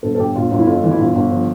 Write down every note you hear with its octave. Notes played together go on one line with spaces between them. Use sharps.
G1 A4
A4
G1 G4
G1 F4
G1
E4
F2 F4
E3
E4
G1 F4
G1
F3